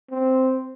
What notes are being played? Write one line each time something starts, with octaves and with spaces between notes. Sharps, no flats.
C4